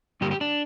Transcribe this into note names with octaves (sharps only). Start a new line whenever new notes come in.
G2 D3 G3 A#3 G4
G4
D4